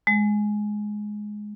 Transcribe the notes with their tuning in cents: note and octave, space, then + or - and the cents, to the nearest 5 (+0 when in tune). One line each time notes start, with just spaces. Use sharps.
G#3 +10